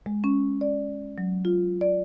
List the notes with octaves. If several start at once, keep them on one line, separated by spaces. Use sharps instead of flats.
G#3
C#4
D5
F#3
F4
D5